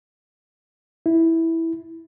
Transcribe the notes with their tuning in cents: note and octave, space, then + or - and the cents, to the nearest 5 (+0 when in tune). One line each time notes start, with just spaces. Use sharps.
E4 -10